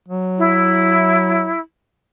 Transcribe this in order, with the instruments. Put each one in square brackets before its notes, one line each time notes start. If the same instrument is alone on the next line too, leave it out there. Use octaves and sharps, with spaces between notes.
[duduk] F#3
[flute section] E4